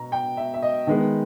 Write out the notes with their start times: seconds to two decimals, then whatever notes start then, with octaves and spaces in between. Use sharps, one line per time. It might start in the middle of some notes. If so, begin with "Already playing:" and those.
Already playing: B2 A#5
0.12 G5
0.37 E5
0.54 E5
0.62 D#5
0.87 D#3 G#3 B3